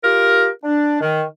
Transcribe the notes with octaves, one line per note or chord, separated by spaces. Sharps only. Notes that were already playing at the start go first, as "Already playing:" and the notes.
F4 G4 A#4
D4
D#3